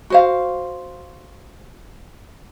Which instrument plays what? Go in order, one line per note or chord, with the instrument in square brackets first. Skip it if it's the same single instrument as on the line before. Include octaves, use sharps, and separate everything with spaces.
[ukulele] F#4 C5 F5